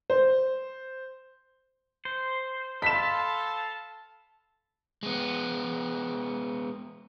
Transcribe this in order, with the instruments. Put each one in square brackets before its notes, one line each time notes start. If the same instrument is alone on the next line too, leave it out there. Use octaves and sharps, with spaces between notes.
[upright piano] C5
[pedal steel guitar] C5
[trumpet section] A4 F5 A5 [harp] B5 C6 [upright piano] B6 E7
[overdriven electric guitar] G#3 B3